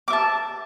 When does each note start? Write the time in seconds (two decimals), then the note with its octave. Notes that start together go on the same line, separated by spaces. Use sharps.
0.08 D6
0.10 E5
0.13 A5